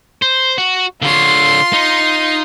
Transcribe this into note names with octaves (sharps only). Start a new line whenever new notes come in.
C5
F#4
D3 F4 C#5 C6
D#4